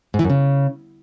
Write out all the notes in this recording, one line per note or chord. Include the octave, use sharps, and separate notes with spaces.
G#2
E3
F#2
C#3